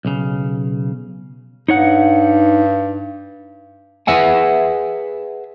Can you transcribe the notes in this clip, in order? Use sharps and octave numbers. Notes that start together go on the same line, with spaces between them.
B1 C#3
G2 D#4 C#5 F#5
G#4 B4 E5 F#5 G#5